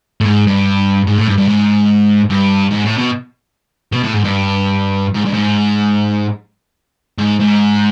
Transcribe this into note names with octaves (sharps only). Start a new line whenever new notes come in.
A2
G#2
G2
G#2
A2
G2
G2
G#2
G2
G#2
A2
B2
B2
A2
G#2
G2
G#2
G2
G#2
G#2
G#2